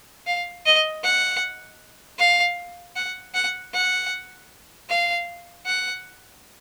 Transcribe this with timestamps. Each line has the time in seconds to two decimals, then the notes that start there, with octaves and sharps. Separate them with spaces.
0.27 F5
0.66 D#5
1.04 F#5
2.19 F5
2.96 F#5
3.34 F#5
3.74 F#5
4.89 F5
5.66 F#5